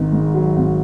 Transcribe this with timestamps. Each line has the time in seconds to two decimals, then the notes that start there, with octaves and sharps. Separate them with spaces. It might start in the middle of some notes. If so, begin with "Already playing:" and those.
Already playing: G#1 D#3
0.12 G#2
0.34 F#3
0.56 G#1